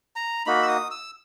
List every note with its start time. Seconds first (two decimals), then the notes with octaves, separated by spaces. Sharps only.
0.16 A#5
0.46 A#3 D#4 F#4 B5
0.62 E6
0.68 D#6
0.91 E6